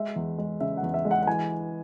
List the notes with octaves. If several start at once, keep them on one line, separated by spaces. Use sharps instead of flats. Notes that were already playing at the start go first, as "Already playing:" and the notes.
Already playing: G#3 E5
E2
G#3
C#3 E5
F#5
E2
E5
G#3
F#5
F#5
E3 G#5